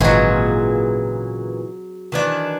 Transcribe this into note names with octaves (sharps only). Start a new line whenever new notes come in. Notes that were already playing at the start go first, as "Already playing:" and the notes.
G#1 A#2 C#3 E3 F#3 C4 G#4 D#5
D#3 E3 D4